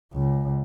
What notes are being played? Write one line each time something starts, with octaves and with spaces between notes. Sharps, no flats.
C#2